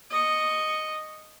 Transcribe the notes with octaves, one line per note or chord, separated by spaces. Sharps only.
D#5 C#6